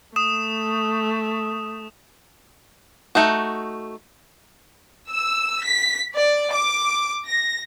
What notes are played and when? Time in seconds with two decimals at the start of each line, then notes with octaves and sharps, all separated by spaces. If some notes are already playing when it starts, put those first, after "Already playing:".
0.16 A3 D#6 E7
3.15 A3 D#4 F#4
5.08 E6
5.63 B6
6.15 D5
6.50 D6
7.27 A#6